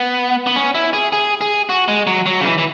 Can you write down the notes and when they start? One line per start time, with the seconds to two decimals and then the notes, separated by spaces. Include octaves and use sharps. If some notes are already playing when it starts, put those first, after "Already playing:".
Already playing: B3
0.47 B3
0.56 C#4
0.75 E4
0.93 G#4
1.13 G#4
1.41 G#4
1.69 F#4
1.88 G#3
2.07 F#3
2.26 F#3
2.41 C#3
2.45 E3
2.58 E3